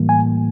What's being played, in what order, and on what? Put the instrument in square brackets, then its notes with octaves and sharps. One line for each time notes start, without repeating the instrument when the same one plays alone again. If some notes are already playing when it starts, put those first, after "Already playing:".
Already playing: [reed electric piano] A2 E3 G3 A#3
G#5